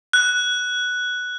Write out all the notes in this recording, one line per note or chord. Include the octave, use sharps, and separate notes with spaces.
F#6